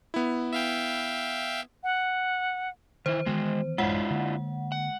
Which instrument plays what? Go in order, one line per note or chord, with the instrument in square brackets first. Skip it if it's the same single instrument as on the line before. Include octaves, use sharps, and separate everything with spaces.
[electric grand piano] B3 E4
[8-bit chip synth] E5 F5 G5
[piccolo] F#5
[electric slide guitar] D#3 E3 E4 [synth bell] C5
[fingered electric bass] D#3 E3 B3 [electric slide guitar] G#3 F#4
[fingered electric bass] A1 F#2 [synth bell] G#3 F#5 [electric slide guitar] D4 E4 F4
[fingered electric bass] D3 A#3
[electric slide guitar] F#5